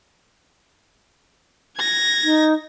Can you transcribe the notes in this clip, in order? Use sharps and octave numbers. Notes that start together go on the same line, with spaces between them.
G#6 A#6
D#4